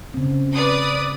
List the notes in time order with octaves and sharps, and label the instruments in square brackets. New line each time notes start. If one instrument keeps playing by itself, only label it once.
[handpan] C#3 C4
[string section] B4 D5 D#6